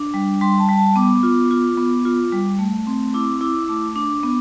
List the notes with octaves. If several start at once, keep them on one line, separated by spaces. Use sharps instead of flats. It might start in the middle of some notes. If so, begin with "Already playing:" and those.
Already playing: D4
G3
G3 C6
A5
G3
A5
B3 D6
F4
F4
B3
F4
G3
A3
C4
E4 D6
E4 D6
A3 D6
D4 D6
B3